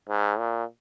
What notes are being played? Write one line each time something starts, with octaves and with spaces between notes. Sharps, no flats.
G#2
A#2